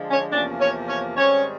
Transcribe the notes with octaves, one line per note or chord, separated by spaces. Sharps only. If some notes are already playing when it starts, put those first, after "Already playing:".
Already playing: D3 F3 G#3
C#4 C#5
E2 C3 F3 A#3 C#4 D4 D5
C#4 C#5
C#4 C#5
G#2 D#3 G3 C4 C#4 C#5